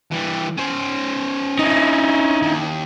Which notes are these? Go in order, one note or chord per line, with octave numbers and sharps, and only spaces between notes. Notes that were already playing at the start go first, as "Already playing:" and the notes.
E3 G3
C#4 C5
D#4 E4
D#2